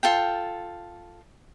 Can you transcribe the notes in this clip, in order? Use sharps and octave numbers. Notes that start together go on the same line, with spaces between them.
F4 A4 G5